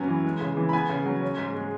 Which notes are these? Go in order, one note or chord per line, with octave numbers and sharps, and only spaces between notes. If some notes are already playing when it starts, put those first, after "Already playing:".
Already playing: F#2 F#3 B3 G#5
E3
G#3
C#3
E3
B5
B3 G#5
C#3
F#3
C#4
G#2
G#3